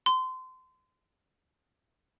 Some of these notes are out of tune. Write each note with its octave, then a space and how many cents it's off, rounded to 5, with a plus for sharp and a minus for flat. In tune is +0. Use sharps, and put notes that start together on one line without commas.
C6 -25